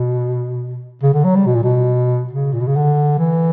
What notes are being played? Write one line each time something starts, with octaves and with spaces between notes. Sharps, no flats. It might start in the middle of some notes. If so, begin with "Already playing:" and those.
Already playing: B2
C#3
D3
F#3
G3
B2
A#2
B2
C#3
A#2
B2
C#3
D3
E3